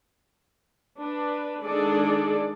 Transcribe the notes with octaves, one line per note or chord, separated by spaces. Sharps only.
D4 B4
D#3 G#3 D4 G#4 A4 D5